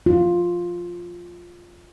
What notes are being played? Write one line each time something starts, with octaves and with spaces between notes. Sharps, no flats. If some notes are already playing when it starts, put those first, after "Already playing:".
F4